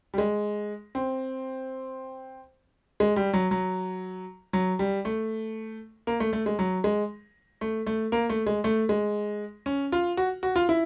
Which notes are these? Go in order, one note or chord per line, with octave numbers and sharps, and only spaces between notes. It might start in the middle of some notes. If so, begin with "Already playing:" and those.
G3
G#3
C4
G#3
G3
F#3
F#3
F#3
G3
A3
A#3
A3
A3
G#3
F#3
G#3
A3
A3
A#3
A3
G#3
A3
G#3
C#4
F4
F#4
F#4
F4
E4